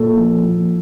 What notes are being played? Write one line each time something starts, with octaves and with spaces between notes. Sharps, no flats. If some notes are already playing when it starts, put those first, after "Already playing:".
Already playing: A#2 A4
F3
F3